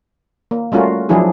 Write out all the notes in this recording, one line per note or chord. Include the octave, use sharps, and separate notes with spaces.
A#3
G3 A3 C#4 F4 F#4 A#4
F3 F#3 D4 E4 G#4